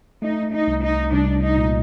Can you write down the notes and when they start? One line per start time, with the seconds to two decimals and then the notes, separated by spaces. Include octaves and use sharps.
0.22 A3 D#4
0.52 D#4
0.67 C2
0.82 D#4
1.12 C2 D4
1.42 D#4
1.57 A#2